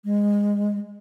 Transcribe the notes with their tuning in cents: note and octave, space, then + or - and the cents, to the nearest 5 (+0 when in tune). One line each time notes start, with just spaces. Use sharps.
G#3 -20